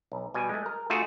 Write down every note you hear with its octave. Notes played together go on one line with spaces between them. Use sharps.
B1
B2 G3 G#5
G#3 A3
A#4
A3 F4 F#4 G#4 A4